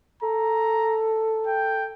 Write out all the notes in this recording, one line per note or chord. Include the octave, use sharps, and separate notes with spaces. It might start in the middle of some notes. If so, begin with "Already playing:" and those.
A4 A#5
G5